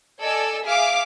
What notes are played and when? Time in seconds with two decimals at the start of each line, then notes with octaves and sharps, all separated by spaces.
0.21 A4 D5 D#5 G#5 E6
0.66 G#4 E5 F5 D6 F6